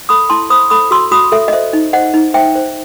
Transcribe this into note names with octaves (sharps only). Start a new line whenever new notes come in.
A4 B5 D#6
E4 A5 C6
C5 B5 D#6
A4 B5 D#6
F#4 C6 E6
F#4 B5 D#6
A4 E5
D#5
C5 E5
D#4
C5 D#5 F#5
D#4
C5 E5 G5
C5